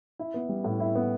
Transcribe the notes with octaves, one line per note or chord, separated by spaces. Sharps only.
E4
B3
G3
A2
E4
B3